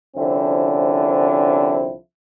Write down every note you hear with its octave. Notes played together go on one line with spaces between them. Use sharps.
C2 D3 F3 C4 C#4 E4